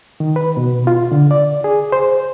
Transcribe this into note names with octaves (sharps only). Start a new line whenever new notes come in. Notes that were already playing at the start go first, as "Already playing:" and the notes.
D#3
B4
B2
F4
D3
D5
G#4
C5